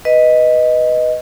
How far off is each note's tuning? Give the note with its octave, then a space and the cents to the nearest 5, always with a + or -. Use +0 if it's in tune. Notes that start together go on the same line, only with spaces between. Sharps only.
B4 +0 D#5 +0